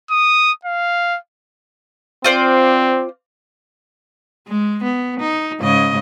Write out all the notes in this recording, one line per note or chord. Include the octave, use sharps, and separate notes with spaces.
D#6
F5
C4 F4 C5 D5
G#3
B3
D#4
G#2 C#3 D#5